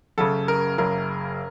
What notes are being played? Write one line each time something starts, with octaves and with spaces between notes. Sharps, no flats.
F#1 F#2 C#3 A4
A#4
F#1 F#2 C#3 A#4